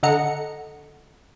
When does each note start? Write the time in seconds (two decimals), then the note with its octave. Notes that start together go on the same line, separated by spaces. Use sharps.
0.03 D3 A4 D#5 F#5 A#5 C#7